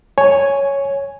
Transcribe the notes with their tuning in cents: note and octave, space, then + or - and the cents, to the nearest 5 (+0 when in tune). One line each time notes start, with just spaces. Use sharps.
C#5 +0 G#5 +0